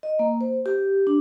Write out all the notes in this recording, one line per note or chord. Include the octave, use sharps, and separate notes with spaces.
D#5
A#3
C5
G4
D4